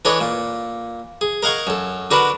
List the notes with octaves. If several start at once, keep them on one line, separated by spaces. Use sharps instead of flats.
E3 D4 A4 C#5 D#5
A#2
G#4
A#4 D#5 F5 F#5 G#5 C#6
F#2 A4
D3 D4 F#4 A#4 B4